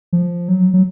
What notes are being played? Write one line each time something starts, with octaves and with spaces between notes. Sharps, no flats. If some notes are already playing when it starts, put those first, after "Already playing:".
F3
F#3
F#3